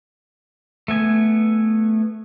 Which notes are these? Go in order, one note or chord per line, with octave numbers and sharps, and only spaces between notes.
A3 B3 G#5